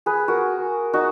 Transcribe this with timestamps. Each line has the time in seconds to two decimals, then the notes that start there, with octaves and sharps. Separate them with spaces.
0.06 G#4 B4
0.28 F#4 A#4
0.93 D#4 F#4